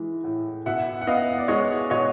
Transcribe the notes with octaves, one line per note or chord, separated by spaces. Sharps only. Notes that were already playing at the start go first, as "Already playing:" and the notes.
Already playing: E3 G#3
A2
B2 E5 F#5
F#5
B3 D#5 F5
D5
G#3 C#5 D#5
B2 C#5 D#5